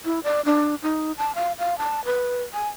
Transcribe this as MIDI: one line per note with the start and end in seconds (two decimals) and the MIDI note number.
0.05 0.20 64
0.24 0.41 74
0.45 0.75 62
0.83 1.12 63
1.18 1.32 81
1.35 1.52 77
1.59 1.77 77
1.78 2.04 81
2.05 2.43 71
2.54 2.69 80